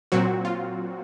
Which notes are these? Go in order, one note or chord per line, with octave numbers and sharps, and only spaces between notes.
A#2 F#3 C4 F#4
F4